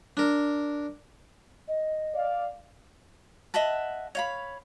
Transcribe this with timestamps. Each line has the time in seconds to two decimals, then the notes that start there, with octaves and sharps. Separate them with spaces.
0.17 D4 A#4
1.68 D#5
2.14 D5 F5
3.54 D#5 E5 F#5 A5
4.15 C#5 F5 B5